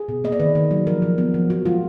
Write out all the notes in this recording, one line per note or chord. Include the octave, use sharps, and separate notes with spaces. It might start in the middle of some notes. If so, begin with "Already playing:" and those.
Already playing: G#4
B2
A#3 D#5
D5
D#3 B4
D#3
F#3
F3 A#4
F3
B3
F3
F3 F#4
G#3 F4